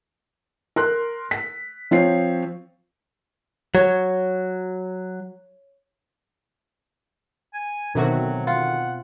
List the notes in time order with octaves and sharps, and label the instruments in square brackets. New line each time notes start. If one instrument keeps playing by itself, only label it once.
[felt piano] A#4 C6 F#6
B6
F3 C4 F4 C#5 C7
[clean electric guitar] F#3 [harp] C#5
[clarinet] G#5
[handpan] B2 C4 E5 [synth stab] D3 D#3 F#4 [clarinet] F#3
[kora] F4 [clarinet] F#5